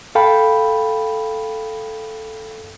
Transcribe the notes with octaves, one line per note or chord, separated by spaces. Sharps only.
A4 F5 G5 B5